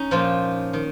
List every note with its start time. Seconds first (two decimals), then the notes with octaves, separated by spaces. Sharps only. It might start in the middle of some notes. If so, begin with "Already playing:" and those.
Already playing: C#4 D#4
0.11 A#2 F3 F4
0.73 D#3